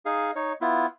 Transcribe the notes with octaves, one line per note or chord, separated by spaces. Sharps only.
D#4 G#4 F5
D#4 C#5
B3 E4 F4